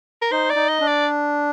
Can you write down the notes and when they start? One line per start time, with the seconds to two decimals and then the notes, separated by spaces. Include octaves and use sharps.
0.22 A#4
0.31 D#4 C5
0.50 D5
0.56 D#4
0.68 D#5
0.81 D4
0.87 D5